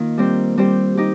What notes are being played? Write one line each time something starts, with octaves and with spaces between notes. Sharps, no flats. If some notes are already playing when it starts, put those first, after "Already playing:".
Already playing: D#3 A#3 F4
G3 C4 G4 C5
G3 C4 G4 C5
D#4 G4